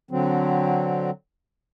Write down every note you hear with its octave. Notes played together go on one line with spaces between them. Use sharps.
D3 F#3 C4